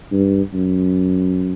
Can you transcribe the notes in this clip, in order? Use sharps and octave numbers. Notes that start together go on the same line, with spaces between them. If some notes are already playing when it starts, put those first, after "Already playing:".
G2
F#2